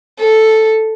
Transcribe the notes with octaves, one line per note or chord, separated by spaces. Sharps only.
A4